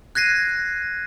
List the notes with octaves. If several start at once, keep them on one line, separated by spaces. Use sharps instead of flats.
F#6 G#6 A#6 C7 D#7